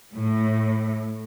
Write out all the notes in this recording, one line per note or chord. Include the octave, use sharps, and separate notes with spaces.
A2